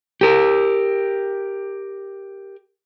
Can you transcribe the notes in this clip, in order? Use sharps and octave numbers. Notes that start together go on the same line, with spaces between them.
G4 A#4